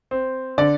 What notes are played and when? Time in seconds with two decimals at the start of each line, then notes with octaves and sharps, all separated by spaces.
0.11 C4
0.58 D3 D5